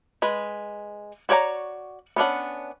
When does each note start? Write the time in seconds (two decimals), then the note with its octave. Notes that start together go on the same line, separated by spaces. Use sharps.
0.22 G#3 B4
1.29 F#4 C#5 D5 G5 A#5
2.16 B3 C#4 D4 F#5